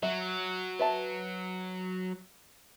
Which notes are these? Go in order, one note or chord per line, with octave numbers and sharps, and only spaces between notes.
F#3 E5
B4 E5 A5